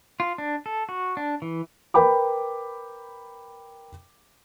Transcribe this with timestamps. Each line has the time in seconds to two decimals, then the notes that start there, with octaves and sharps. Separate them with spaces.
0.20 F4
0.38 D4
0.66 A4
0.89 F#4
1.17 D4
1.42 E3
1.94 A#4 B4 G5 B5 D6